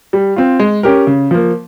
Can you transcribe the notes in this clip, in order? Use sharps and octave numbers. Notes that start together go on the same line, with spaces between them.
G3
C4 F4
G#3
C#4 G4 A#4
C#3
F3 A#3